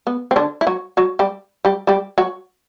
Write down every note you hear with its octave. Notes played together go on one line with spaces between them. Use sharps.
B3
C4
D3 D4
E4
F#3 F#4
F#3 F#4
G3 G4
G3 G4
G3 G4
F#3 F#4